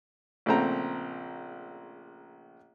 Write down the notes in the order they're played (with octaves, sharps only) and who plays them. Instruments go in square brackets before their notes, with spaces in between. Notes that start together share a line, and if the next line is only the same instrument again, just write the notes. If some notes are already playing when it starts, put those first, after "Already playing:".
[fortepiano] A#1 C#3 A3 C4 F#5 A#5